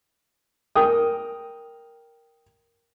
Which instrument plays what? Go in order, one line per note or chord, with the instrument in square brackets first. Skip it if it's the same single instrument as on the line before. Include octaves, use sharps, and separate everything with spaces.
[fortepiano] A#4 G5 D#6